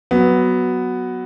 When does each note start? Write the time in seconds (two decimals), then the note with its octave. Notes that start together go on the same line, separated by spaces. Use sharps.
0.11 F#3 B3